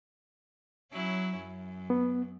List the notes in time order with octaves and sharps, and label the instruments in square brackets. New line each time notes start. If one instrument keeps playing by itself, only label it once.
[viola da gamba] F#3 C#4 E4
F#2
[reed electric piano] B3